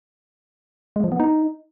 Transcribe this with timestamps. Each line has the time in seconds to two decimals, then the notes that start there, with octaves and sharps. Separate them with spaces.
0.96 G#3
1.04 F3
1.12 B3
1.20 D#4